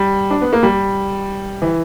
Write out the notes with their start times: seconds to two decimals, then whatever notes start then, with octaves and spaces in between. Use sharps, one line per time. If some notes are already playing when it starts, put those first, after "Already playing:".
Already playing: G3
0.30 D4
0.41 B3
0.53 A#3
0.63 G3
1.62 E3